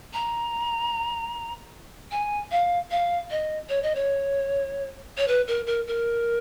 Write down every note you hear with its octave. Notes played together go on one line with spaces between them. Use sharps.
A#5
G#5
F5
F5
D#5
C#5
D#5
C#5
C#5
B4
A#4
A#4
A#4